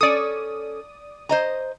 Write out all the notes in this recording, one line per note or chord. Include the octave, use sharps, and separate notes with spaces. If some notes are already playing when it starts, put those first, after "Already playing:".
C#4 A4 D5 D#6
C5 D#5 A#5